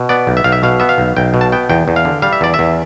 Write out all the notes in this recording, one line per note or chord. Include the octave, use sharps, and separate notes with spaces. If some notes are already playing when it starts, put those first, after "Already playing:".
Already playing: B2
B3 D5
B1
E5
B1 F5
E5
B2 F5
B3 E5
F5
B1
B1 G5
B2
A5
B3 G5
E2 G5
E2
F5
D3
G3 F5
E5
E2 D5
E5
E2